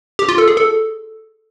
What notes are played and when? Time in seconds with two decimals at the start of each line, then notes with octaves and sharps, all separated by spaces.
0.19 G4
0.29 F4
0.38 A4
0.48 G#4
0.57 A4